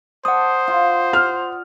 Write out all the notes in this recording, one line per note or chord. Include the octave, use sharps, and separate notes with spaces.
C5 D5 F#5 A5 D#6
F4
F6